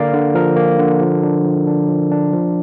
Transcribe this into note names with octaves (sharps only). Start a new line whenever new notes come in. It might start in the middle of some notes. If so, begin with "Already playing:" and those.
Already playing: D3 A#3 A#4 D5 F5
D3
F3 A#4
A#3
D3
F3
D4
F3
D4
F3
D4
F3